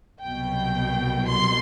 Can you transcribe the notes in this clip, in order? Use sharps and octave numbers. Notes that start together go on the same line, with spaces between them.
C2 B2 F#3 G5
C6